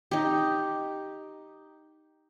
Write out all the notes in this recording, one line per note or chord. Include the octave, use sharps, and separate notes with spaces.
D#4 G4